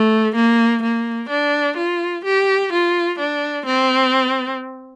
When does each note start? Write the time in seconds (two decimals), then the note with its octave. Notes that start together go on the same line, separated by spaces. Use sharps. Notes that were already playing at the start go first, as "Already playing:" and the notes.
Already playing: A3
0.36 A#3
0.83 A#3
1.30 D4
1.77 F4
2.25 G4
2.72 F4
3.19 D4
3.66 C4